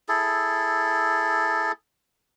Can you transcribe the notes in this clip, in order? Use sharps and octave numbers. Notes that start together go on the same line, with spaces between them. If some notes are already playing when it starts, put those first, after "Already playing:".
E4 G#4 A4